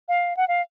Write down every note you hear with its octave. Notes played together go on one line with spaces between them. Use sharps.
F5
F#5
F5